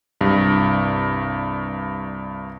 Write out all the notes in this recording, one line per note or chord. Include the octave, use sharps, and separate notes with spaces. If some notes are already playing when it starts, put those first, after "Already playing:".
C2 G2